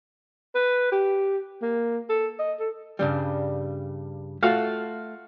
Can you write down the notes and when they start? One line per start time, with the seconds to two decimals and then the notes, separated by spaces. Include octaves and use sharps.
0.55 B4
0.92 G4
1.62 A#3
2.09 A4
2.39 D#5
2.60 A4
2.99 G2 C#3 G3
4.43 A3 F4 F#4 F5